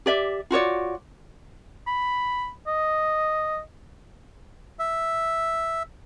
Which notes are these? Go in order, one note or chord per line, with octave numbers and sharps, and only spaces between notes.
G4 D5 E5
F4 F#4 C#5 D5
B5
D#5
E5